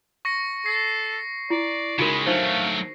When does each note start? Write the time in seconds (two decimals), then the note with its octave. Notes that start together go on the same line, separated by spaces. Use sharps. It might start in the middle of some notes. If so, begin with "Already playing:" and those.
0.25 C#6 A#6 C#7
0.66 A4 C7
1.50 E4 D5
1.99 C#3 G#3 D#4 F#4 A#4 B5
2.27 F#3 A3 D4 D#4 C5 F5